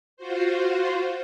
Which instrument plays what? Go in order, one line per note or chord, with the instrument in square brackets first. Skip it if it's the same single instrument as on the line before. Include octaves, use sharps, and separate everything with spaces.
[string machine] F4 F#4 C5